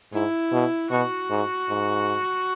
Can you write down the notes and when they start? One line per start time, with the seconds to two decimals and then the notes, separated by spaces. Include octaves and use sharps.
0.12 G#2 E4
0.52 B2
0.91 B2 F#4
1.30 G#2
1.69 G#2